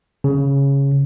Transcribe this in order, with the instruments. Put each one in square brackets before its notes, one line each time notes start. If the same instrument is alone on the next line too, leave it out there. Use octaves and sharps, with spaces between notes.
[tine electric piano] C#3